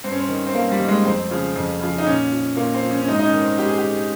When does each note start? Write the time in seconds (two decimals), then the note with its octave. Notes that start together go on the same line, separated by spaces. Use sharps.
0.04 G2 C4
0.12 C#4
0.20 C4
0.29 D#3
0.47 C4
0.54 G2 A#3
0.72 G3
0.80 D#3
0.89 G#3
1.05 F2 C4
1.31 C#3 F3
1.56 F2
1.81 C#3 F3
1.98 D#4
2.07 A#2 C#4
2.32 F3
2.56 A#2 A#3
2.74 C4
2.83 F3
2.91 C#4
3.02 C#4
3.08 G#2 D#4
3.19 D#4
3.25 C#4
3.32 D#3
3.42 C4
3.58 G#2 G4
3.68 G#4
3.77 G4
3.84 D#3